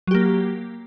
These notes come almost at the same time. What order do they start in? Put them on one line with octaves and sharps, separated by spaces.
F#3 G4 A#3